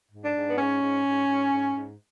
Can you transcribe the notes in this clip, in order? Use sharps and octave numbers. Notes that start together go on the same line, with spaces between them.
G#2
D4
G#2
B3
G#2 C#4
G#2
G#2
G#2
G#2
G#2